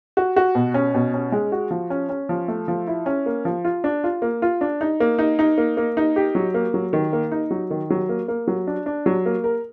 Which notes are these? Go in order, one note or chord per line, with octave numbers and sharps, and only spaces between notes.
F#4
F#4
B2
C#4
B2
C#4
G#3
F#4
F3
C#4
C#4
F3
A3
F3
E4
C#4
A#3
F3
F4
D4
F4
A#3
F4
D4
D#4
A#3
D#4
D#4
A#3
A#3
D#4
G4
F#3
A#3
F#3
D#3
A#3
D#4
F#3
D#3
F#3
A#3
A#3
F#3
D4
D4
F#3
A#3
A#4